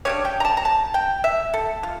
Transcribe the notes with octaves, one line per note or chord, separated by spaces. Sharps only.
C#3 G3 D4 C#5
G5
A#5
A5
A#5
A5
G5
E5
A4
F4